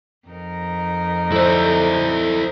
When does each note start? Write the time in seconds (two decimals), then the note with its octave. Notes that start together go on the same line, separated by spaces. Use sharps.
0.28 F2 D#4 A#4
1.32 E4 A4 C5 D5